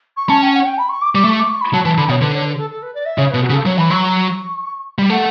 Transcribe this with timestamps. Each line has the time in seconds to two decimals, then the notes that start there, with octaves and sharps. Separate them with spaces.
0.16 C#6
0.28 C#4 A5
0.42 G5
0.53 F#5
0.65 G5
0.78 B5
0.89 C#6
1.01 D6
1.13 G3 D6
1.25 A3 C#6
1.38 D6
1.49 C#6
1.61 B5
1.73 F#3 A5
1.85 E3 A5
1.97 D3 B5
2.09 B2 C#5
2.21 D3 B4
2.33 C#5
2.45 B4
2.54 G4
2.57 A4
2.70 A4
2.82 B4
2.94 D5
3.05 E5
3.17 C#3 C#5
3.30 B2 B4
3.42 F#4
3.50 C#3
3.53 A4
3.66 F#3 C#5
3.78 E3 B5
3.90 F#3 C#6
4.02 C#6
4.98 G3
5.10 A3 F#5